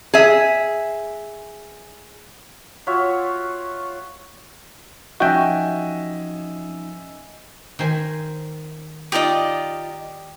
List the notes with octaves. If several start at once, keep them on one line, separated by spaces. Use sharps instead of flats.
G#4 E5
F4 F#4 C#5 E5
F3 C#4 D#4 F#4 D#5 E5 G5 G#5
D#3 C5 G#5
D#4 F4 G4 D5 D#5